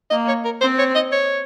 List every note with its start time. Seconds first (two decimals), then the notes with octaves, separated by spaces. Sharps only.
0.10 A#3 D#5
0.27 C#5
0.45 A#4
0.61 C4 C5
0.78 C#5
0.95 D#5
1.12 C#5